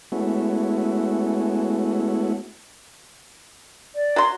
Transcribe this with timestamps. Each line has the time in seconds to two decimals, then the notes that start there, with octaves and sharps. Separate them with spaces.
0.12 G#3 A3 B3 C#4 E4 F#4
3.95 D5
4.16 F#3 C6